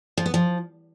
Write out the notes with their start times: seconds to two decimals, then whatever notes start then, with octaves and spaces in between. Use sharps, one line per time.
0.18 F3
0.26 B3
0.34 F3